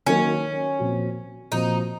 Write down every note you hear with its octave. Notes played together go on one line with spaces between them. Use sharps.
D#3 F#3 A#3 C#4 D#4 A#4
A#2 F3 C4 F#4
A#2 F3 C4 D#4 F#4